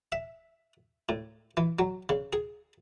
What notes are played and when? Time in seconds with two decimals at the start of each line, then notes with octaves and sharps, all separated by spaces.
0.12 E5
1.09 A2
1.57 E3
1.79 F#3
2.09 C#3
2.33 G#4